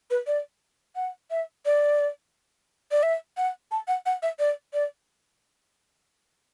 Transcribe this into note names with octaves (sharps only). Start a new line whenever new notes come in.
B4
D5
F#5
E5
D5
D5
E5
F#5
A5
F#5
F#5
E5
D5
D5